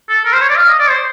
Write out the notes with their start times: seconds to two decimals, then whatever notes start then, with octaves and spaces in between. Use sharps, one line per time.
0.09 A4
0.25 A#4
0.33 C5
0.42 C#5
0.49 D5
0.57 F5
0.68 D#5
0.79 D5
0.89 C5